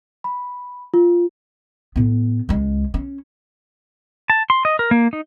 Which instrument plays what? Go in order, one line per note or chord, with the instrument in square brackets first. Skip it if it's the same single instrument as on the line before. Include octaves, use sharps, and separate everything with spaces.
[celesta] B5
F4
[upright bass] A2 B3
C#2 G#3
C#4
[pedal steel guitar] A5
C6
D#5
A#4
A#3
D#4